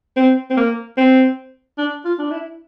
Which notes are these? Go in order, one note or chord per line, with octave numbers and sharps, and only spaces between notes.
C4
C4
A#3
C4
D4
F4
D4
E4